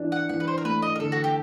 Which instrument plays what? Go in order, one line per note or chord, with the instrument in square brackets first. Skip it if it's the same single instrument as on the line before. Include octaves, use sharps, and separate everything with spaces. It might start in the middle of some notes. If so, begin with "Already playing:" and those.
Already playing: [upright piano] E3 D4
[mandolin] F#5
[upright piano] E3 [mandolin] F#5
[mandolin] B4
C5
A#4
[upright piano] A3 [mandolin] B4
[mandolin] D#5
A#4
[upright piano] D3 [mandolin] A4
[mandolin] F#4
G4